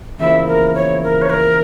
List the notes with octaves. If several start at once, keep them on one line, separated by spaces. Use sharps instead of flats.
E2 C#3 F3 A#3 E4 E5
A#4
C#5
A#4
C#5
A#4